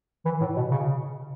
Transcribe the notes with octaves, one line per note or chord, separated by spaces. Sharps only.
E3
A2
B2
C#3